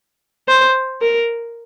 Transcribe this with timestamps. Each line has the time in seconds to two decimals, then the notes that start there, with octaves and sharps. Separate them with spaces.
0.48 C5
1.02 A#4